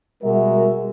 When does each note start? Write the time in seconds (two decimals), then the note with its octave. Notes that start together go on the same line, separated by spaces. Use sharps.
0.23 B2 G3 G#3 F#4 A#4 E5